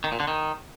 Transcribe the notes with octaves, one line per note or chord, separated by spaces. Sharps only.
D#3
A#2
D3
D#3